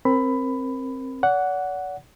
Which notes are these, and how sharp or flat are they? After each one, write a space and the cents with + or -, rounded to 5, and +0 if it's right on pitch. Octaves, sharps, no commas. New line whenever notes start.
C4 +15 A#4 +0 B5 +15
D5 -45 F#5 +0